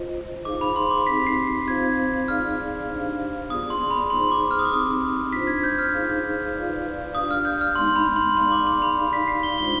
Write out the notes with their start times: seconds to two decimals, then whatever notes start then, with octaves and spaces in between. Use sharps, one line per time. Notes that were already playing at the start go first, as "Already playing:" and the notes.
Already playing: F4 C5 D#5
0.45 D#4 G#4 C5 F5 D6
0.61 B5
0.76 C6
0.91 D6
1.07 C4 D#4 G4 B6
1.27 C7
1.47 C7
1.67 C4 F4 C5 F5 G#6
2.28 D#4 G#4 D5 F5 F6
2.89 D4 G4 C5 F5
3.50 B3 F4 G#4 D5 D#6
3.70 C6
3.91 B5
4.10 D#4 G#4 C5 C6
4.32 D6
4.51 F6
4.59 D#6
4.65 D6
4.72 C4 D#4 G4 D#6
5.32 D4 F4 C5 B6
5.47 G#6
5.64 G6
5.79 F6
5.93 D#4 G#4 C5 F5
6.54 F4 B4 D5 F5
7.15 D4 G4 D5 F5 D#6
7.31 F6
7.45 G6
7.61 F6
7.75 G#3 B3 D#4 C6
7.96 B5
8.16 C6
8.37 D#4 G#4 D5 F5 C6
8.52 D6
8.67 C6
8.82 B5
8.98 D#4 G4 D5 F5
9.13 B6
9.28 C7
9.43 G7
9.58 G#3 D4 F4 C5 G7